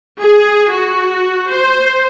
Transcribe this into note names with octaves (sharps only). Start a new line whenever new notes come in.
G#4
F#4
C5